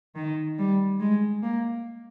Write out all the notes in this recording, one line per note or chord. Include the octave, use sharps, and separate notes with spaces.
D#3
G3
G#3
A#3